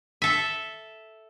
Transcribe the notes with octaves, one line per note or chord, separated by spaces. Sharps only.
A4 E5